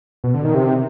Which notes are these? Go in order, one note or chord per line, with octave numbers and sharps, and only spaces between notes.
B2
D3
D#3
C3